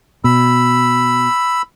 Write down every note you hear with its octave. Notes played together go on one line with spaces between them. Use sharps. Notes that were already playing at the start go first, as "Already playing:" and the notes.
B2 B5 E6